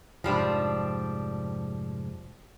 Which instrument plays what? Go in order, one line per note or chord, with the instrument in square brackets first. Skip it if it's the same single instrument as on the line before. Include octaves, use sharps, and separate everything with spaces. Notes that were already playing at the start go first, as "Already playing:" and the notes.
[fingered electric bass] F1 G#2 [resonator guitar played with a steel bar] F3 G3 D4